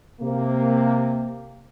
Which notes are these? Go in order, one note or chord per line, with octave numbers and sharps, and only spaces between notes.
C3 A#3